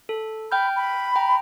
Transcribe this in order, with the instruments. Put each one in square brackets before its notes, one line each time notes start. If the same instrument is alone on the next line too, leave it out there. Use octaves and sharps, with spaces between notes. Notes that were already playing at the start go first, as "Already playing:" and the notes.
[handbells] A4
[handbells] G5 F6 G6 [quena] B5
[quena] B5
[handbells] G5 A#5